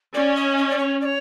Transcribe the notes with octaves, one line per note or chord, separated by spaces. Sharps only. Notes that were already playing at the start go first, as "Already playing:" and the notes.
C#4 D5
D#5
D#5
D5
C#5
D5
C#5